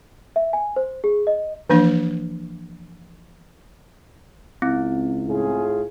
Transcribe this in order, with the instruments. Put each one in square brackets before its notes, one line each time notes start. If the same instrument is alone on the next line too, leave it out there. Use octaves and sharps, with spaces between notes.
[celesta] E5
G#5
C5
G#4
D#5
[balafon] E3 F3 A#3 D4
[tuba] C#2 [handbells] C4 [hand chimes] E4
[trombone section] A2 F4 G#4